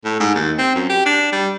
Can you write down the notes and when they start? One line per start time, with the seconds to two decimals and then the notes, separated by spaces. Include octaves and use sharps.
0.05 A2
0.20 G#2
0.35 D#2
0.58 C4
0.75 F#2
0.90 G4
1.06 D4
1.33 G3